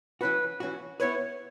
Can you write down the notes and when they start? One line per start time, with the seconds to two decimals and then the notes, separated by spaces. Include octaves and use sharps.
0.21 E3 C#4 F#4 B4
0.60 E3 C#4 F#4
1.00 B3 E4 B4 C#5